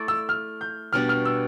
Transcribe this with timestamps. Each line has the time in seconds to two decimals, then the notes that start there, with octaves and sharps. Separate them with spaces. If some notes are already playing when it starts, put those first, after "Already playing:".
Already playing: A3 E4 A4 D5
0.08 E6
0.29 F6
0.61 G6
0.93 B2 G3 D4 F6
1.09 F6
1.25 E6